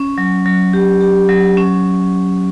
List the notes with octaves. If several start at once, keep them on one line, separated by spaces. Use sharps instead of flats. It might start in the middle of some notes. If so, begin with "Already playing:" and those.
Already playing: C#4
F#3
F#3
G4
G4
F#3
C#4